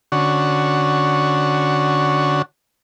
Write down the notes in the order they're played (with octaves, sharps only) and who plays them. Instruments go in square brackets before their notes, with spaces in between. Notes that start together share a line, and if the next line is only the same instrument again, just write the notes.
[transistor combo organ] D3 C#4 F#4